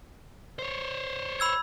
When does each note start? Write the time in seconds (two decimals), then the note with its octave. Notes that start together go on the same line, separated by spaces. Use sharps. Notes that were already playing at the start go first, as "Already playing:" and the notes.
0.59 C5 C#5
1.40 B5 E6 G#6